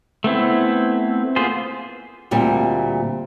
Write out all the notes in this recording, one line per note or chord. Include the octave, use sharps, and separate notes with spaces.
A3 B3 C4 E4
A#3 B3 F4 G#4 C5
D2 A#2 G3 C4